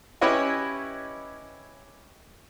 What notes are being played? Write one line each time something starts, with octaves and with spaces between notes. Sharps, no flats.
C#4 E4 G4 B4 C#5 D#5